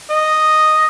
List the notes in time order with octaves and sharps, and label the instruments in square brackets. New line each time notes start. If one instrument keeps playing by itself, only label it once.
[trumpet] D#5